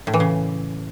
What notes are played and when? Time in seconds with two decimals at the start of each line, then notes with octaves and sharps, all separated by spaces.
0.07 A2
0.14 E3
0.20 C#3